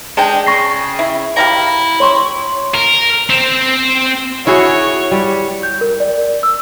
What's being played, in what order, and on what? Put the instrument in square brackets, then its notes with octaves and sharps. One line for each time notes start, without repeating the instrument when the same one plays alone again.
[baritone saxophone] G#3 [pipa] D4 G5
[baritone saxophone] C#3 [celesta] C#6 A#6 C7
[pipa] E4
[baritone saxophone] E4 [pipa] G4 F5 A#5
[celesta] C#5 C6 C#6
[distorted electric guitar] A#4
C4
[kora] E4 F#4 G#4 [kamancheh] C#5
[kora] G3
[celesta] G6
A#4
D5
E6